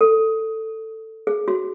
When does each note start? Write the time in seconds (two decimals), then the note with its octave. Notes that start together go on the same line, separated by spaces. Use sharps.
0.01 A4
1.27 G#4
1.48 F#4